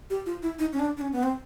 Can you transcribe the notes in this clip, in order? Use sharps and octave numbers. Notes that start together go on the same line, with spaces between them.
G4
F4
E4
D#4
C#4
D4
D4
C#4
B3
C4